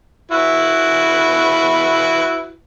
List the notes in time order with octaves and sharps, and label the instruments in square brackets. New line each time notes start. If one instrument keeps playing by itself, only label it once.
[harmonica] E4 F#4 B4